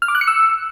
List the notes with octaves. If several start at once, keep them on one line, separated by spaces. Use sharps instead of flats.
F6
D6
F#6
C#7
E6